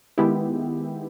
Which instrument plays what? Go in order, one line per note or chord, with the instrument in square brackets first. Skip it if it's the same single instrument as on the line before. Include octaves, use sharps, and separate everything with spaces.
[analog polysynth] D#3 G#3 B3 E4 G4